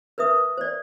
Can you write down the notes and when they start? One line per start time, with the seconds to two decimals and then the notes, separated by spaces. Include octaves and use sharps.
0.18 A#4 B4 E5 D#6
0.57 C5 D5